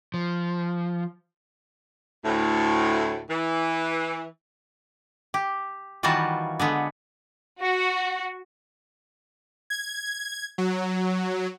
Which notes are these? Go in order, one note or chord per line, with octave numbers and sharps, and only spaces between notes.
F3
D2 A2
E3
G4
D#3 E3 G3 F4 F#4 A5
D3 G#3 B3
F#4
G#6
F#3